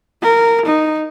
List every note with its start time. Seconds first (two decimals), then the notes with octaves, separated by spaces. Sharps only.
0.23 A#4
0.66 D#4